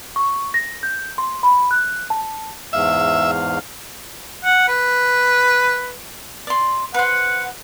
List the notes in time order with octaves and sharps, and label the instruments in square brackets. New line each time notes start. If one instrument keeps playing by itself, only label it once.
[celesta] C#6
A#6
G6
C6
B5
F#6
A5
[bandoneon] E2 G#2 F5 [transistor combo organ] E5
[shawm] F#5
B4
[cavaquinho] D5 C6
[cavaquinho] B4 C5 [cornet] F#5